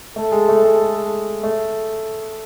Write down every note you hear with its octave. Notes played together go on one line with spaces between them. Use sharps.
A3 A4
G#3
A3
G#3
A3